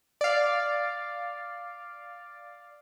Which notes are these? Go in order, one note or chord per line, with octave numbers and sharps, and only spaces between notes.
D5 F5